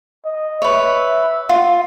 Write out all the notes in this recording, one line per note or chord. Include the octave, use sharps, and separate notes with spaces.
D#5
B4 C#5 E5
F4